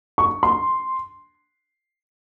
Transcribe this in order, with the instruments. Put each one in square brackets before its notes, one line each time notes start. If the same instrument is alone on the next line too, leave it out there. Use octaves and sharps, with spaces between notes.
[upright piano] C#6
C6